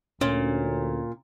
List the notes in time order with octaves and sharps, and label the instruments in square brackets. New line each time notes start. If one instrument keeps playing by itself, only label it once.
[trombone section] D2 [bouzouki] A#2 [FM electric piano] C#4